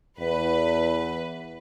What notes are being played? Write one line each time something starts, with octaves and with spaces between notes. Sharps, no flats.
E2 B4